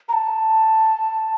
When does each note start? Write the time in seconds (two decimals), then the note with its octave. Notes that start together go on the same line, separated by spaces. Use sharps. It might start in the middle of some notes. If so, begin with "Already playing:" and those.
0.09 A#5
0.13 A5